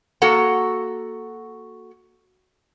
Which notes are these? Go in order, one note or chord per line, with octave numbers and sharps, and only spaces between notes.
A#3 F#4 A4 F#5 A#5